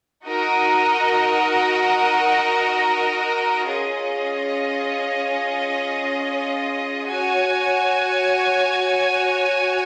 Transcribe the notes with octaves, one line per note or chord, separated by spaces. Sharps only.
D#4 F#4 A#4 D#5 F#5
C#4 F4 G#4 D#5
F#4 C#5 G#5